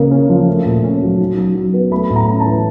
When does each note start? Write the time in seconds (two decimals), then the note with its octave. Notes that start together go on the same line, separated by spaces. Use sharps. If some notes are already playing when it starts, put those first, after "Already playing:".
Already playing: C#3 A#3
0.11 C#4
0.29 F3
0.47 A3
0.65 A#2
0.84 C#4
1.02 F#3
1.19 D#4
1.37 F#3
1.55 F#3
1.74 B3
1.91 A3 B5
2.10 A2
2.16 A#5
2.28 C#4
2.40 A5
2.46 E3